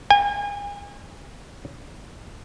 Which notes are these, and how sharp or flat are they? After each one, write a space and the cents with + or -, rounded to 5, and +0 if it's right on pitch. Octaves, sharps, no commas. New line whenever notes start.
G#5 -35